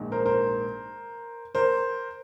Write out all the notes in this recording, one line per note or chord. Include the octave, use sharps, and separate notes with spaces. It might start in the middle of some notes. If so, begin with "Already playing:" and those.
Already playing: A#1 G#2 D#3
A#4 C5
A#4 C5
A#4 C5